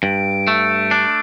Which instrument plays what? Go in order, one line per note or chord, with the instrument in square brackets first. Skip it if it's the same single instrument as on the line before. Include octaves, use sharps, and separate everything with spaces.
[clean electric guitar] G2 [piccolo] D7
[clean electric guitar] A3
D4